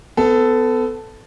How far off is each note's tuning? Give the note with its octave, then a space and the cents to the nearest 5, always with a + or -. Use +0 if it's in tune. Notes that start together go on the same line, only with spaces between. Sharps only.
B3 +30 A4 +0